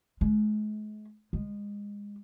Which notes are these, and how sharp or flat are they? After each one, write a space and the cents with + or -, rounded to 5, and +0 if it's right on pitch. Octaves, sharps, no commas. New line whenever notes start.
G#3 +40
G#3 -25